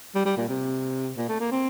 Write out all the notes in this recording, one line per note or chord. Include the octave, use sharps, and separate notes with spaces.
G3
G3
A#2
C3
A#2
A3
A#3
C4